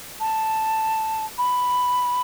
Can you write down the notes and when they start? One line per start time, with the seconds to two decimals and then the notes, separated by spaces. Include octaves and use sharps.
0.20 A5
1.38 B5